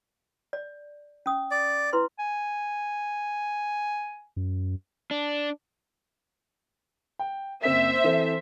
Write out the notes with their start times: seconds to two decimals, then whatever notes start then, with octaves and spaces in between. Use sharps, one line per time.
0.53 D5
1.26 C#4 D#6
1.51 D5
1.93 E4 B4 C6
2.19 G#5
4.36 F#2
5.11 D4
7.19 G5
7.63 F#1 C4 C5 E5 B6
8.04 E3 C4 A4